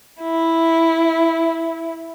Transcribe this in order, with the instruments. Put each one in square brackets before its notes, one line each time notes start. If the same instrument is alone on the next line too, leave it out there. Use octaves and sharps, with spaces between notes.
[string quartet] E4